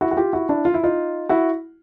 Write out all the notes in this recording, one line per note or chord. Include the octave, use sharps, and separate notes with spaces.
E4 F#4
F#4
F4 G4
E4 F#4
D4 E4
F4
E4
D#4 F4
E4 F#4